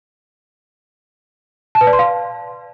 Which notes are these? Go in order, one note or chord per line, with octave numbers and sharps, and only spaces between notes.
A5
B4
D5
C6
F5